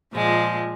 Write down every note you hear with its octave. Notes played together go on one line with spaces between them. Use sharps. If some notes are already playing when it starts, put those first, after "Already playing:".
A#2 F3 G#3